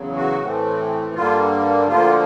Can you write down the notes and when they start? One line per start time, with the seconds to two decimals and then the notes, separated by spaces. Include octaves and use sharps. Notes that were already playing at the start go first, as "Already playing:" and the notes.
Already playing: E2 C#3 F#3
0.16 F#4
0.41 A2 E3 A3 C4
1.15 G2 D3 G3 A#3 F4
1.87 D2 D3 F3 A#3 F4